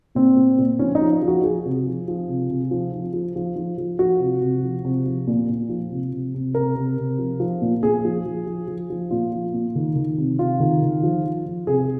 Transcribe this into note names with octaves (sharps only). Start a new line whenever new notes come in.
A#2 C4
A#2
A#2
F3 C#4
D#4
F3
F3
F#4
F3 G#4
C3
F3
F3
C3
C3
F3
F3
F3
F3
F3
F3
F3 F#4
C3
C3
F3
C3
F3
A#2
A#2
F3
C3
C3
C3
C3 A#4
C3
C3
F3
F3
A#2
A#2 G#4
F3
F3
F3
F3
F3
A#2 F4
F3
A#2
D#3
D#3
C3
C3 F4
D#3
D#3
F3
F3
F3
C3 G#4